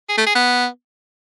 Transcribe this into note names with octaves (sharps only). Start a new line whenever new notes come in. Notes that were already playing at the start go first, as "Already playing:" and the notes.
G#4
A3
G#4
B3